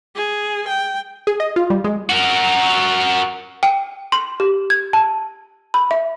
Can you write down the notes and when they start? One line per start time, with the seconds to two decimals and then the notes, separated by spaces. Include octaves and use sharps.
0.15 G#4
0.68 G5
1.27 G#4
1.40 D#5
1.56 F4
1.70 G3
1.84 G#3
2.09 F#4 A#4
3.63 G5
4.12 C6
4.40 G4
4.70 G#6
4.93 A5
5.74 B5
5.91 E5